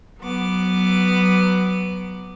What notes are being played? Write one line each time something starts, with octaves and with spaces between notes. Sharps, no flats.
F#3 B3 D6